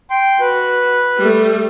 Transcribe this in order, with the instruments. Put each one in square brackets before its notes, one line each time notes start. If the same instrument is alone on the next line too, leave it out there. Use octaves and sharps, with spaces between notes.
[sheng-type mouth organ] G5 C6
[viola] F#4 [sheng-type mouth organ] B4
[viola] G3 A3